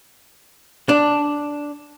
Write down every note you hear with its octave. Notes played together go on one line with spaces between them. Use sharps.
D4